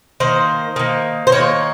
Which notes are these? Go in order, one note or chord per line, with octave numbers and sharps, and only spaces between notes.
D#3 A#3 C5
D#3 A#3
C5
D#3 A#3 C#5